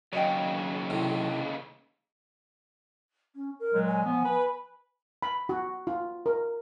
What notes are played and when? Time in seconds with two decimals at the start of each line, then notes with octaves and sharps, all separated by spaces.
0.13 D#2 C#3 F#3 D5 D#5 G5
0.90 A2 C3 A3
3.35 C#4
3.60 A#4
3.73 A#2 F#3 G#3
3.88 G#5
4.04 F3 B3
4.24 B4 B5
5.22 B5
5.49 F#4
5.87 F4
6.26 A#4